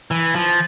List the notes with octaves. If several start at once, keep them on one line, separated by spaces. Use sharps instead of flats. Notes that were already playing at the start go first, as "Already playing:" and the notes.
E3
F3